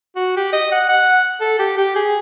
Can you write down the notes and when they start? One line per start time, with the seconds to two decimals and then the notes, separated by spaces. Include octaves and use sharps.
0.16 F#4
0.37 G4
0.53 D#5
0.72 F#5
0.89 F#5
1.41 A4
1.59 G4
1.77 G4
1.96 G#4